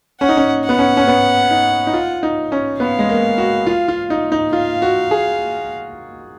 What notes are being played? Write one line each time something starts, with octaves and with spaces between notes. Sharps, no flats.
C#4 F#5
D#4
C#4
B3 F#5
C#4
C#4
B3
D#4
D#4
F4
D#4
C#4
B3 F5
G#3
A#3
F#4
F4
F4
D#4
D#4
F4 F5
F#4
G#4